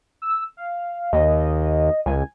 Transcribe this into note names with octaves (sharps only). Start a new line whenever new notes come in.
E6
F5
D#2 D#5
C#2 G#5